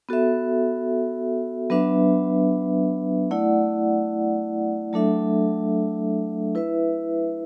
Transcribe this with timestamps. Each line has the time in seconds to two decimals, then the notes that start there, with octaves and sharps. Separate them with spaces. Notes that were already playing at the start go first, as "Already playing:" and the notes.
0.09 B3 F#4 A4 E5
1.70 F#3 B3 D4 B4 E5
3.31 A3 E4 D5 F#5
4.93 F#3 A3 D4 A4 E5
6.55 E4 B4 E5